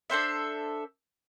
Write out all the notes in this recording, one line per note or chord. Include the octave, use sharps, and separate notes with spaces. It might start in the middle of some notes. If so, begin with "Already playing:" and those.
D4 A4 C5 E5